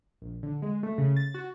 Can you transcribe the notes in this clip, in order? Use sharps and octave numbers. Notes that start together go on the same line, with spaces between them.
A#1
D3
G#3
A3
C#3
A6
F#4